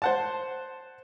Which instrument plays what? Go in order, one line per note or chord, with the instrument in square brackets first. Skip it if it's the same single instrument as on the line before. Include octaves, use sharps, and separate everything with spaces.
[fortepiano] C5 F#5 A5